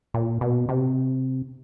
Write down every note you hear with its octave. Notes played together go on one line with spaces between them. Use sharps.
A#2
B2
C3